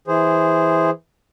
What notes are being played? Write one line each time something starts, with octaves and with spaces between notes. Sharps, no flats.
E3 G#4 C5